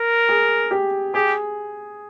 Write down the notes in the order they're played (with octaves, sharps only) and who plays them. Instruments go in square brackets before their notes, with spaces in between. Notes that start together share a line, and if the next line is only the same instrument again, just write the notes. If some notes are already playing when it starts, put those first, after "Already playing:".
Already playing: [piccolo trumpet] A#4
[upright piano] G#4
G4
[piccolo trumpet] G4 [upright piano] G#4